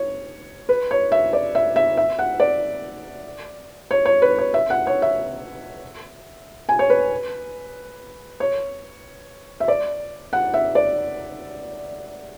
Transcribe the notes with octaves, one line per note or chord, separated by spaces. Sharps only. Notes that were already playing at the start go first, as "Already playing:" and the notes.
Already playing: C#5
B4
C#5
E5
D5
E5
E5
E5
F#5
D5
C#5
C#5
B4
C#5
E5
F#5
C#5
E5
G#5
C#5
B4
C#5
E5
D5
F#5
E5
D5